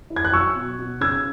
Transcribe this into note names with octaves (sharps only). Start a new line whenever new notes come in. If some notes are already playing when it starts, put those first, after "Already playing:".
E4
G#6
F#6
F#3 C#6 E6
B2
B2
C#3 E6 G#6